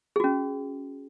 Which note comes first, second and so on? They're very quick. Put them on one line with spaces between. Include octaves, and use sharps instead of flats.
G#4 F#4 C#4